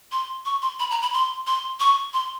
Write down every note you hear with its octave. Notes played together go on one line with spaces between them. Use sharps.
C6
C#6
C6
B5
A#5
B5
C6
C6
C#6
C6